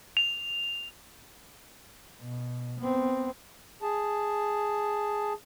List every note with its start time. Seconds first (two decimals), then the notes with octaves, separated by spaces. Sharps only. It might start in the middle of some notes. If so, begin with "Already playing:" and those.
0.17 F7
2.21 B2
2.80 B3 C4
3.82 G#4 A5